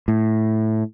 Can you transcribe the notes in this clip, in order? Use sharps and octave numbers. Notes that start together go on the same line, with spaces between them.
A2